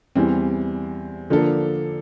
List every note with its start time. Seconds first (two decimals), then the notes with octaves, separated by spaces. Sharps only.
0.15 E2 E3 G3 C4
1.30 D3 F3 A#3 D4 A4